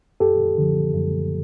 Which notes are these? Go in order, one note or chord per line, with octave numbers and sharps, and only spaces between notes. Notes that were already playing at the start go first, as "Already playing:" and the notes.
F#2 G4 A4
D3 F3
F#2